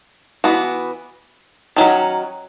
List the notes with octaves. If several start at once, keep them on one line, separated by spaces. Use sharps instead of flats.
E3 B3 F#4
D#3 F#3 C#4